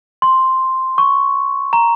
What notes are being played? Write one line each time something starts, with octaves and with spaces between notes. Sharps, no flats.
C6
C#6
A#5